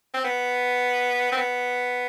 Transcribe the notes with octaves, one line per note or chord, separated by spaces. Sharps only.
C4
B3
C4
B3